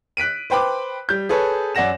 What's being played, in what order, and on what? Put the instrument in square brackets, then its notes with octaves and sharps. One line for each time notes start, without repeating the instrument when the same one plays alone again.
[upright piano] F#6 B6 D7 D#7
B4 C5 G5 B5 D6
G3 G6
G#4 A4 B4 C#5
F#2 D5 F#5 A#6 E7